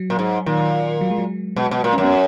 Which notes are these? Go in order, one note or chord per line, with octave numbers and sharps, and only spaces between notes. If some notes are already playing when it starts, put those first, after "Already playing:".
Already playing: F#3
A#2
G#2
A#2 D#3
F#3
G#3
F#3
B2 G#3
B2
A#2
C#4
F#2
B3